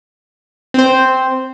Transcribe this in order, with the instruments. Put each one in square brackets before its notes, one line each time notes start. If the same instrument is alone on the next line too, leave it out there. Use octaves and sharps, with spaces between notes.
[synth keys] C4 C5